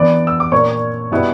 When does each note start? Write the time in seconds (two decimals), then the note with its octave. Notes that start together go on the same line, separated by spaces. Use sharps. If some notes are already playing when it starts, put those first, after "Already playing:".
Already playing: E3 B3 D4 D5 D6
0.27 E6
0.40 D6
0.52 A#2 A#3 D4 C#5 C#6
1.12 B2 G3 B3 E4